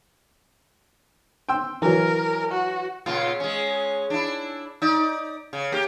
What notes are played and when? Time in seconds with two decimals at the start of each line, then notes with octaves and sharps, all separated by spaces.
1.49 G5 C6 E6
1.82 E3 F#3 A#4
2.51 F#4
3.06 A#2 C#3 F4
3.40 G#3 C#4
4.10 D4 E4
4.82 D#4 D5
5.53 C#3
5.72 A#3 G4